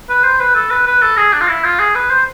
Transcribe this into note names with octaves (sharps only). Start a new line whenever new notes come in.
B4
C5
B4
A4
B4
B4
A4
G#4
D4
F4
E4
F4
G#4
B4
C5